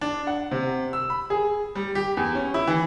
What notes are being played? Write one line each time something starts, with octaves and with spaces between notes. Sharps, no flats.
D4
F#5
C3
E6
B5
G#4
G3
G4
E2
C#4
E4
E3